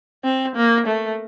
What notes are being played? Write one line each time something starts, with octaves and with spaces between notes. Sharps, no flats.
C4
A#3
A3